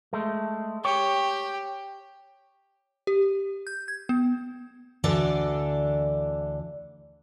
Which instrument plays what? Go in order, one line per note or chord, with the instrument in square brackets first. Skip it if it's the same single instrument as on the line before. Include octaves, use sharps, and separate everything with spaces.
[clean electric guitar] G#3 A3
[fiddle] G4 [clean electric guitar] C#5
[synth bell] G4
G6
G#6
B3
[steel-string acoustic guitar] D2 D3 E3 D4 A4 D5